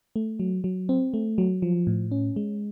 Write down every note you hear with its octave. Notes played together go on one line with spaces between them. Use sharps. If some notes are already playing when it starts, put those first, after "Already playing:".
A3
F#3
F#3
C4
A3
F#3
F3
A2
C#4
G#3